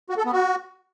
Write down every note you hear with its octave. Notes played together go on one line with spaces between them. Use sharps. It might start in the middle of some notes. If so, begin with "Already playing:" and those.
F#4
A4
B3
F#4